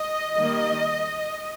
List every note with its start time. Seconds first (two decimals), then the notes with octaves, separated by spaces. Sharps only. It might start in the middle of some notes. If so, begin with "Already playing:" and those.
Already playing: D#5
0.37 D#3 G3 A#3